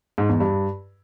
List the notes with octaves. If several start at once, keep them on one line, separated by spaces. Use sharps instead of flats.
G#2
E2
G2